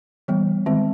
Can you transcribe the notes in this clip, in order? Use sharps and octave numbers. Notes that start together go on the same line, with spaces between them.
E3 G3 B3
D#3 G#3 C4